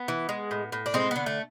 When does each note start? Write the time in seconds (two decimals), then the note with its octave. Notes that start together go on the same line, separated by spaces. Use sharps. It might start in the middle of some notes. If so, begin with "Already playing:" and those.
Already playing: B3
0.08 E3
0.29 G#3
0.51 A2
0.72 A2
0.86 D4
0.94 G#3 C4
1.11 D3 B3
1.26 A3